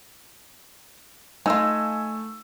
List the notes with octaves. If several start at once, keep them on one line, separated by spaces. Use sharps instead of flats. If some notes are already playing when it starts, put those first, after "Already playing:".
A3 D#4 F4 D#5 G#5 E6